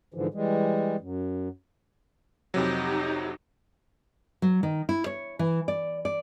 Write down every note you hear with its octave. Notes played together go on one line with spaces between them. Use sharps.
G#2 D3 E3 F3
E3 G3 G#3
F#2
F2 C3 F#3 D#4 G4
F#3
D#3
E4
C#5
E3
D5
D5